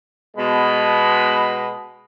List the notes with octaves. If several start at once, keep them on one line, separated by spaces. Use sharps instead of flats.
B2 G#3 B5